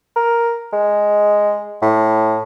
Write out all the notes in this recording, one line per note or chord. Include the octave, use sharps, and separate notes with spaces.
A#4
G#3
A2